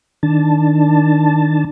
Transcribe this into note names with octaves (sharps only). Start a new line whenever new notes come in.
D#3 D4 A5